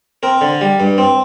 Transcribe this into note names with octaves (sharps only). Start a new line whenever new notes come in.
C4 A#4
D3
G3
G2
C4